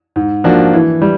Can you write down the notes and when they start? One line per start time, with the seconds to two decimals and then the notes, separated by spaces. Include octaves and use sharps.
0.16 G#2
0.44 F3 A#3 D4 F#4
0.73 E3
1.02 G3